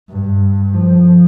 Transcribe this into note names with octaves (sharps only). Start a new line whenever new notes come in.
G2
F3